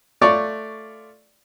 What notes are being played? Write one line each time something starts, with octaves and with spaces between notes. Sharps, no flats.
A3 F4 C#5 D5 C#6